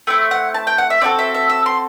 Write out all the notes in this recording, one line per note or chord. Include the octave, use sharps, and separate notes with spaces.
A3 C4 E4
F#5
A5
G5
F#5
E5
C4 F#4 A4 D5
E5
E5
E5
C6